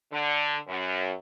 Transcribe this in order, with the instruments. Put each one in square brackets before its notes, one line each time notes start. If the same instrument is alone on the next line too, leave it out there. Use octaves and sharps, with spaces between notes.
[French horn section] D3
F#2